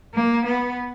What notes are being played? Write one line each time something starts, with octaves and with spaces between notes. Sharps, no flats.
A#3
B3